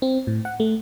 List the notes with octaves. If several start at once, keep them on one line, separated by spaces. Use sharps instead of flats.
C4
A2
F#5
A3